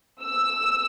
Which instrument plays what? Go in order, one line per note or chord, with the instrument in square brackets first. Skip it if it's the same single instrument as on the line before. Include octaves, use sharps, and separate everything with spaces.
[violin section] E6